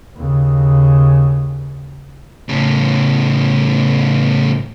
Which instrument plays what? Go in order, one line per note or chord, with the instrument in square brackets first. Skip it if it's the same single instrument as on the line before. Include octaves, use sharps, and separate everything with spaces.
[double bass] D#2 C#3
[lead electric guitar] A2 C#3